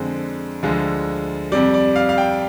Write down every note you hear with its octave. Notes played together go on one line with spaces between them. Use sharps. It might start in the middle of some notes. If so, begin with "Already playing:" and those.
Already playing: F2 D3 G#3 C5
D2 D3 F3 G#3
F2 C3 G3 D5
D5
F5
F5
G5